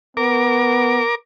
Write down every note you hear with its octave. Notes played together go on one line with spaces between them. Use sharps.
B3 A#4 D6